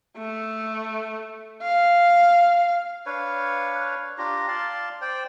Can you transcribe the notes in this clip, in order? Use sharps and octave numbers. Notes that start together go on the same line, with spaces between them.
A3
F5
D4 B4 C#5 F5
D4 F4 G4 A#5
D5 F5 A5 C6
C5 D5 G5